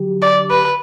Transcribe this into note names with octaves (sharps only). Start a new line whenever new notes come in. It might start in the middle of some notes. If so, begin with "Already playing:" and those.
Already playing: D3 F#3 G4
D5
B4